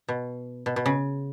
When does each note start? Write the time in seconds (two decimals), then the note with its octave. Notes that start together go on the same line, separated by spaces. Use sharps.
0.09 B2
0.66 B2
0.76 B2
0.86 C#3